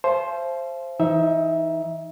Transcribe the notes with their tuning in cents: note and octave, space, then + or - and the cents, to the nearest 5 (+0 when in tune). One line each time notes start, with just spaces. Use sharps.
C5 +10 F5 -45 A5 -40
E3 +0 D#4 +25 E5 +0